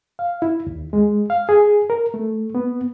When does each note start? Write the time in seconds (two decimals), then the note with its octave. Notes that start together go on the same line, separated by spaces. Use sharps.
0.19 F5
0.42 E4
0.67 D#2
0.93 G#3
1.30 F5
1.49 G#4
1.90 A#4
2.14 A3
2.55 B3